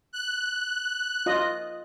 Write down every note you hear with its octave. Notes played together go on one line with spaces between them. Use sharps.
F#6
F4 D#5